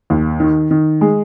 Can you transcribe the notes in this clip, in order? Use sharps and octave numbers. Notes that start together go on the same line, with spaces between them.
D#2
D#3
D#3
G#3